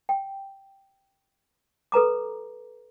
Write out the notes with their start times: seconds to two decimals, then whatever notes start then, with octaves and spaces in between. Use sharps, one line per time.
0.09 G5
1.92 A4 B4 A#5 D6